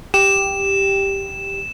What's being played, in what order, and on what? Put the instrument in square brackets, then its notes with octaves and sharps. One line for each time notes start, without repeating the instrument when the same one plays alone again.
[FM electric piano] G4 [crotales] E7